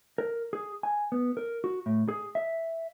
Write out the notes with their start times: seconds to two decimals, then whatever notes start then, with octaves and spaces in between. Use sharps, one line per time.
0.18 A#4
0.53 G#4
0.83 G#5
1.12 B3
1.37 A#4
1.64 F#4
1.86 A2
2.09 G#4
2.35 E5